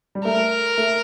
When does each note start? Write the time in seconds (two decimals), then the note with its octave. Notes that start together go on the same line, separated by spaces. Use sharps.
0.15 G3
0.25 A3 A#4
0.78 A3